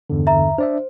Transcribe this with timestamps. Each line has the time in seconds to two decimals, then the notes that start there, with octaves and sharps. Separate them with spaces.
0.10 E2 G2 D3
0.27 E5 A#5
0.58 D4 C5 D5 E5